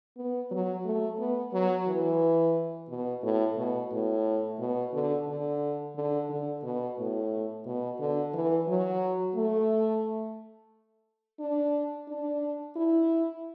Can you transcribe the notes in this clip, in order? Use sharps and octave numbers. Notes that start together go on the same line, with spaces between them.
B3
F#3
A3
B3
F#3
E3
B2
A2
B2
A2
B2
D3
D3
D3
D3
B2
A2
B2
D3
E3
F#3
A3
D4
D4
E4